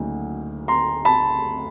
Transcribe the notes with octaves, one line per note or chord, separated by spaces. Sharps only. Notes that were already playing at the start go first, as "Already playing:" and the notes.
Already playing: D2 C#3 F#3 A#3 D#4
A#5 C6
A5 B5